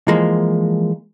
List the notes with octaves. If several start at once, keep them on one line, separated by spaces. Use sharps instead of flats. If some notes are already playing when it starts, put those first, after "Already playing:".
E3 F3 G#3 A#3